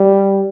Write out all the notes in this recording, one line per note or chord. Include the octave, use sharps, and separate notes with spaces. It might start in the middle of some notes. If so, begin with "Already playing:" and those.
Already playing: G3